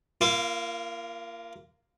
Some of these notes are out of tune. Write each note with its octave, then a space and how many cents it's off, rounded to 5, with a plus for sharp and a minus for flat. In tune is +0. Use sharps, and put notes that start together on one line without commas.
A#3 +0 F4 -40